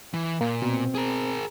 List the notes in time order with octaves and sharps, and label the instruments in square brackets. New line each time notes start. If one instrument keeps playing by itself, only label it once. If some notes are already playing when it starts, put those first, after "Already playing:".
[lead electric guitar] E3
[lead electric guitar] A#2 [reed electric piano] A#3
[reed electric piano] B2 [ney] C4
[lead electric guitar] G#4 A#4